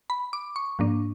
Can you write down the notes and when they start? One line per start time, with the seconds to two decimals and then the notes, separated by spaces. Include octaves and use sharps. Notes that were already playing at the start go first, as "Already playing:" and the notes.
0.10 B5
0.33 D6
0.56 C#6
0.79 G#2 F3 A#3 D4